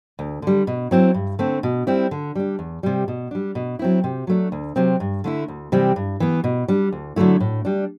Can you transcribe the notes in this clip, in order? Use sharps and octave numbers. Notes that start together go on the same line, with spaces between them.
D2
D3 G3
B2
F#3 C4 E4
G2
D3 A3 C4
B2
G3 C4 E4
D3
G3 D4
E2
C3 G3
B2
G3 D4
B2
F#3 C4 E4
C3
F#3 A3 D4
D2
C3 F#3 C4
G2
D3 A3 E4
D2
C3 E3 G3 C4
G2
E3 B3
B2
G3 D4
D2
D3 F#3 A3 E4
A2
G3 D4